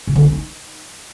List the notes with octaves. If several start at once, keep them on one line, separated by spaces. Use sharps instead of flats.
C#3
D3
E4
D#4